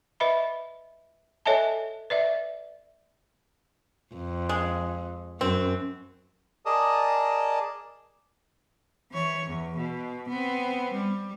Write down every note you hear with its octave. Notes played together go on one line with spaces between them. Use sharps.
B4 D#5 E5 B5
A4 C#5 D#5 E5 G#5 A5
B4 D5 E5
F2
G#3
F#2 C4
G#4 A#4 D5 D#5 A5 D#6
E3 C#5
E2
B2
B3 C4
G3